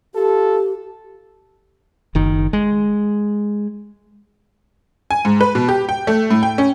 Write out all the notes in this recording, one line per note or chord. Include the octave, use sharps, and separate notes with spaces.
F4 G4 A4
F#1 D#3
G#3
G#5
G#2
B4
B2
G4
G5
A3
A2
G5
C#4